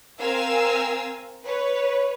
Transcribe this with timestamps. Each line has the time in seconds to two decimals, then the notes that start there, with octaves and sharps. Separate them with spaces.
0.20 C4 A#4 F5 G#5 E6
1.45 B4 C#5